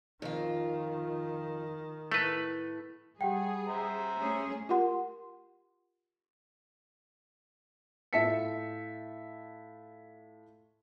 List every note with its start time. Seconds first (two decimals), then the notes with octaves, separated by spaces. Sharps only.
0.22 F2 D#3 F4
2.12 A2 A3 B4
3.21 G3 G4 G#4 F#5 G5
3.68 C5 E5 A#5
4.17 A3 C#4 G#4
4.69 F4 G4 A#4 F#5 C6
8.13 A2 F4 E5 A5 B6 C#7